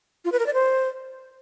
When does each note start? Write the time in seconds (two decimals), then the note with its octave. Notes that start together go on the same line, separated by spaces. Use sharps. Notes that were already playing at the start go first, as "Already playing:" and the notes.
0.25 F4
0.32 B4
0.39 A#4
0.46 D5
0.54 C5